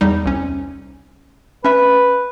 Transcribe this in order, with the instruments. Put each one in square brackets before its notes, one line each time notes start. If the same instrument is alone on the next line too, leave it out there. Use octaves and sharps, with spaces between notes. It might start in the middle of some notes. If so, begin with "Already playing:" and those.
[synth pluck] E2 G3 D#4
C2 C#4
[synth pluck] C#4 E5 [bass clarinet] B4